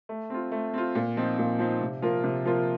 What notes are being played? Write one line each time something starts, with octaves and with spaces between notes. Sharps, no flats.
A3
C4 F4
A3
C4 F4
A#2
F3 C4 D#4
A#2
F3 C4 D#4
C3
F3 A#3 F4 A#4
C3
F3 A#3 F4 A#4